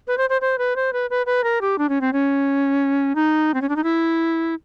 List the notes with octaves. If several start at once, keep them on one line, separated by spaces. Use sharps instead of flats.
B4
C5
C5
C5
B4
C5
B4
B4
B4
A#4
G4
D4
C#4
C4
C#4
D#4
C4
C#4
D4
D#4
E4